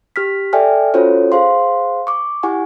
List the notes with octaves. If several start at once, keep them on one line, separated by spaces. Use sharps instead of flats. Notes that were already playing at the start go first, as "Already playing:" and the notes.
G4 F6 B6
A4 D5 E5 G5 G#5 F6
C#4 F4 F#4 A4 C5 C#5
G#4 C5 F5 C6
C#6 D6
E4 G4 F#5 G#5 C#6